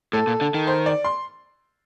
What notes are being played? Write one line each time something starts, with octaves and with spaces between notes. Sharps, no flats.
A2 A4
A#2
D3
D#3
C5
D5
C6